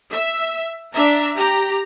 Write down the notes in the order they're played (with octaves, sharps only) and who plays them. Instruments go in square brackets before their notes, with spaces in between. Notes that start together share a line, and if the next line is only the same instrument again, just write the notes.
[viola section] E5
D4 E5 A#5
G4 A#5